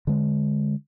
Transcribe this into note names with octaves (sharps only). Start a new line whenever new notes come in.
D3 G#3